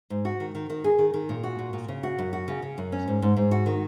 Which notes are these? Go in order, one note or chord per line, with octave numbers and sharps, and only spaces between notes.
G#2
F#4
D#3
D#3
D#3
G#4
D#3
D#3
A#2
F#4
A#2
A#2
C#3
F#4
F#2
F#4
C#3
C#3
F#2
C#4
G#2
G#2
G#2
F#4
D#3